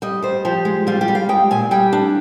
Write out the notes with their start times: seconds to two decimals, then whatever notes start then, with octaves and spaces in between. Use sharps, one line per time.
0.02 G3 D#5
0.22 G3 C5
0.45 F3 G4
0.65 G#3
0.87 G3 F4
1.01 G4
1.08 G3
1.15 F5
1.29 G#3 G5
1.51 A#2 G#5
1.71 G3 G5
1.93 D4